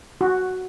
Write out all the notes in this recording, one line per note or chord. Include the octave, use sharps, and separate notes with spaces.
F#4